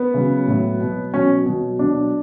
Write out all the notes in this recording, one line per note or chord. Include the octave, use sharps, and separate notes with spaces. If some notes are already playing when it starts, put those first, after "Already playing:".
Already playing: B3
C#3 F#3
A2 F#3
B2 F#3
B2 F#3 C#4
B2 F#3
B2 F#3 D4